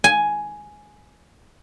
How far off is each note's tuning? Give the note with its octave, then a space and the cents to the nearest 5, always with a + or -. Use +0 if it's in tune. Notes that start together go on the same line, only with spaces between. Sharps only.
G#5 +5